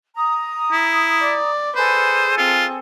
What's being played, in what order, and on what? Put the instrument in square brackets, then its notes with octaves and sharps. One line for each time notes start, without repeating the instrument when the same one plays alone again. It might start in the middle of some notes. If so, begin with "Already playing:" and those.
[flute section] A#5 D#6
[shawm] E4
[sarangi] D5
[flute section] G#4 A4 [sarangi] B4 [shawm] C5
[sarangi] C4 [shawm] F4